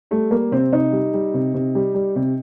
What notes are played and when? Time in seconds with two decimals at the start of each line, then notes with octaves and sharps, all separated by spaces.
0.11 G3 A3
0.31 G3 A#3
0.52 C3 C4
0.72 C3 D#4
0.92 G3
1.14 G3
1.34 C3
1.54 C3
1.75 G3
1.94 G3
2.16 C3